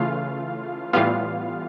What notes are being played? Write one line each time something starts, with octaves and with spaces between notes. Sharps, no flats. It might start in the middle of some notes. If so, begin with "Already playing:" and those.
Already playing: C#3 E3 A3 F4 F5
A2 E3 G3 B3 F4 F5